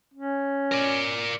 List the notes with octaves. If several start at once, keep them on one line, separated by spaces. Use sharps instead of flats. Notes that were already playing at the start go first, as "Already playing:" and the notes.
C#4
A#4 D5